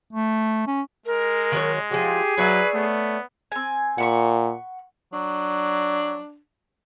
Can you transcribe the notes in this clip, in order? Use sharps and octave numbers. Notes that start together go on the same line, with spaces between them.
A3
C#4
G#3 A#4
D#3 F#3 C#5
F3 F#3 G4 G#4
F#3 B4 C#5 D5 E5
A3 B3
C4 G#5
A#2 F#5 B5 C#6
F#3 D4